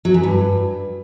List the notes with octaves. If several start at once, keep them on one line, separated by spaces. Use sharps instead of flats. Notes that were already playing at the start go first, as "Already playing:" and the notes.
F#3
F#2
G2